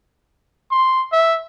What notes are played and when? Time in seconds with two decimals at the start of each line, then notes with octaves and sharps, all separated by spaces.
0.71 C6
1.12 E5